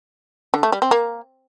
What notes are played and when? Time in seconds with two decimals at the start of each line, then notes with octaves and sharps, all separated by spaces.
0.54 D3
0.63 A3
0.72 G3
0.82 C4
0.91 A#3